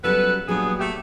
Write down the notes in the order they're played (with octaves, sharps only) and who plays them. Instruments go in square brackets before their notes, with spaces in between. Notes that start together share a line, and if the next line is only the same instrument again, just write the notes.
[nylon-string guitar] C#3 F#3 G3 [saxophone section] B3 A4 B4
[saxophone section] G2 B3 G#4 [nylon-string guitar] A#2 F#3
[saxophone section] A3 G4